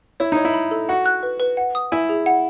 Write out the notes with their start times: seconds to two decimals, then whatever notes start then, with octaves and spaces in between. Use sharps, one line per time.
0.20 E4 C#5
0.32 D#4 C#5
0.45 E4
0.54 B5
0.71 A4
0.89 F#4 F#5
1.06 F#6
1.23 B4
1.40 B4
1.57 F#5
1.75 D#6
1.92 E4 G#5
2.09 G#4
2.26 F#5